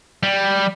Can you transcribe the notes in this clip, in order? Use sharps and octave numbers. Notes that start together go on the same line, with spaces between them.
G3